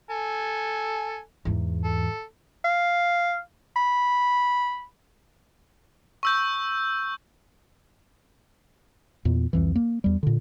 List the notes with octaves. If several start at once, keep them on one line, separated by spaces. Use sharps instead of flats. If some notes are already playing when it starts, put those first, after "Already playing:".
A4 G#5
E2 G#2
A4
F5
B5
C#6 E6 G6
E2 A#2
C2 F2 E3
A#3
E2 G3
A#2 D3